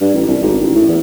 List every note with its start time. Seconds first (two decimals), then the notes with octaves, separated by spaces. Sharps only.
0.01 G2
0.14 A1
0.28 C2
0.41 G#1
0.61 A1
0.75 A2
0.88 E2